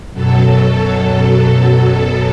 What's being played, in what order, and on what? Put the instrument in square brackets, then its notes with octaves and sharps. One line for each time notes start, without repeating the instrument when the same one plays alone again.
[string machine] F#2 B2 F#3 A4